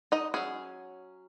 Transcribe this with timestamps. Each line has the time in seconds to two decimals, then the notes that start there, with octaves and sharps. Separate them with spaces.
0.12 D#4 D#5
0.34 F#3 C#4 G#4